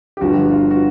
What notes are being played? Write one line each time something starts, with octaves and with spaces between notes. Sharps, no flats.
G4
G1 G2 D3 F3 F#4
F4
F#4